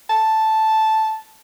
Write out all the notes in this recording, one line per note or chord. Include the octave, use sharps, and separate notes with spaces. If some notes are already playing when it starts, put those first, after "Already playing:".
A5